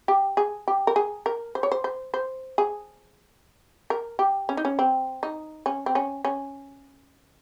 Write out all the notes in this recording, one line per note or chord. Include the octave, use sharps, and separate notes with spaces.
G4
G#4
G4
A#4
G#4
A#4
C5
C#5
C5
C5
C5
G#4
A#4
G4
C#4
D#4
C#4
C4
D#4
C#4
C4
C#4
C#4